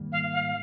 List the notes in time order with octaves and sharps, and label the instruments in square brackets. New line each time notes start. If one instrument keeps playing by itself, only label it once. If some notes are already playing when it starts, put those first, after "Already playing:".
Already playing: [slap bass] G#2 D#3 G3 A#3
[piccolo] F5
F5